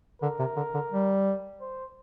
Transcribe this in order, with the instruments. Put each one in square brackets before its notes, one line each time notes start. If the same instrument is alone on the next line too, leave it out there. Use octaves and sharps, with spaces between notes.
[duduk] D3 [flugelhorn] A#4
[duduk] C3
D3
D3
G3
[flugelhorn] C5